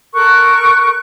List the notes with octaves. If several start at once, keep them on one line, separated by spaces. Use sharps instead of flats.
A4 A#4 C#6 F#6